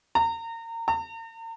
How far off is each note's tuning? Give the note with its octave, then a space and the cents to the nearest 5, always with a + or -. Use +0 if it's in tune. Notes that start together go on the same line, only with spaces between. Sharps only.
A#5 -30
A#5 -45